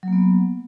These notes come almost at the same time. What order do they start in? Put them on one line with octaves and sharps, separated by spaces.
F#3 A#3 B3